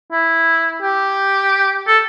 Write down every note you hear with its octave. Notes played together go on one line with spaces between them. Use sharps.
E4
G4
A4